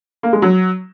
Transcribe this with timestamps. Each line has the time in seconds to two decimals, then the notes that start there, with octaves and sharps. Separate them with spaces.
0.23 A#3
0.33 G#3
0.42 F#3